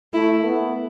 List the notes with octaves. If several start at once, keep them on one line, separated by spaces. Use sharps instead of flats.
A3 E4
B3